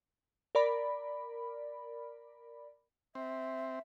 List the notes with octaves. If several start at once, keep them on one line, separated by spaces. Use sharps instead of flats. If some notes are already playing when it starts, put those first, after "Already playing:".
A#4 D5 B5
C4 E5